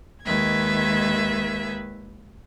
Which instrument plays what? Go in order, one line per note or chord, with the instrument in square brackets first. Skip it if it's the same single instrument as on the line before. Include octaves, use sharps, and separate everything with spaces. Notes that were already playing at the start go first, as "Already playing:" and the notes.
[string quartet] D#2 D#3 G#3 B4 E5 G#6